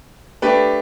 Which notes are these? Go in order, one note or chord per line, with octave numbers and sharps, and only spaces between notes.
A3 D4 G4 B4